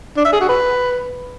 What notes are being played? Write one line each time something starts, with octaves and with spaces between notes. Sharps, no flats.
D4
E5
G#4
F#4
B4